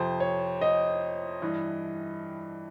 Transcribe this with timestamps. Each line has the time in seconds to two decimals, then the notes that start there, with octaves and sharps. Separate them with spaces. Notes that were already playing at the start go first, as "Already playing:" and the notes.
Already playing: F2 C3 F3 C5
0.20 C#5
0.61 D#5
1.42 G2 E3